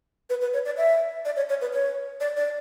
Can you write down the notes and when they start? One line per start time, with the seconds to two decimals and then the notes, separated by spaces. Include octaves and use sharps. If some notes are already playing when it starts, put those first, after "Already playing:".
0.30 B4
0.41 B4
0.53 C#5
0.65 D5
0.77 E5
1.25 D5
1.36 C#5
1.49 C#5
1.61 B4
1.73 C#5
2.20 D5
2.37 D5